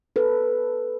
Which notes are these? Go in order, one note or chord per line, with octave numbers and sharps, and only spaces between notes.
A4 B4